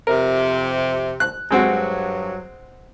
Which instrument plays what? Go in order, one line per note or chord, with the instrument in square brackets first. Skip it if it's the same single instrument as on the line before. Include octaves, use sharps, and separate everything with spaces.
[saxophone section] F2 C3 [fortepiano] A#4
[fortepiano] F#6
[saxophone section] G2 F#3 [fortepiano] G#3 C4 F#4